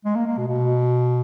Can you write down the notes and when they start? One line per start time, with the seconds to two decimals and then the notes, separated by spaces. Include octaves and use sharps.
0.05 G#3
0.15 A#3
0.26 A#3
0.38 B2
0.48 B2